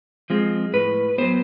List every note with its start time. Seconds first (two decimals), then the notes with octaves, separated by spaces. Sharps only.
0.30 F3 G#3 C4
0.74 A2 B4
1.18 F#3 B3 C5